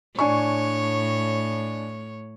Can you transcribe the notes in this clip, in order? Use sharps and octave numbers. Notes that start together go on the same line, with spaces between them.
A2 D4 C#5 G#5 C#6